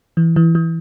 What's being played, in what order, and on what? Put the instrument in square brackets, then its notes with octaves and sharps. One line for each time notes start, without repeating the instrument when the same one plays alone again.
[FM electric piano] E3
E3
E3